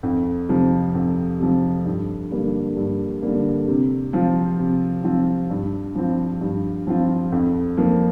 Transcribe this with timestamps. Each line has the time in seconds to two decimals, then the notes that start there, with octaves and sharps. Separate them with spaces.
0.03 F2
0.49 C3 F3
0.95 F2
1.40 C3 F3
1.85 G2
2.31 D3 G3 A#3
2.77 G2
3.22 D3 G3 A#3
3.68 C3
4.13 F3 C4 F4
4.59 C3
5.04 F3 C4 F4
5.50 G2
5.95 F3 C4 F4
6.41 G2
6.87 F3 C4 F4
7.32 F2
7.77 F3 A#3